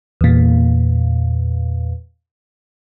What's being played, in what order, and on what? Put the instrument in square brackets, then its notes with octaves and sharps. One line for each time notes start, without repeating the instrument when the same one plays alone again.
[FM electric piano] E2 A#2